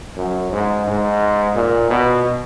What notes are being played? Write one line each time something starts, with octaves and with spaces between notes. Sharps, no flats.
F#2
G#2
G#2
A#2
B2